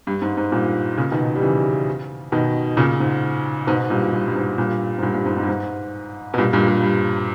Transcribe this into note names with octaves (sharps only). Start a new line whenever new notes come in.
G2
G#2
G#2
G2 A#2
A#2 C#3
B2 D#3
G3
C#3 E3
B2 D#3
A#2 C#3
G#2
G#2 B2
G2 A#2
G2
G2
G#2
G2 A#2
G#2
G2 A#2
G2
G#2
G#2
G2
G#2
B2
G2 A#2
G2 A#2
G2
G2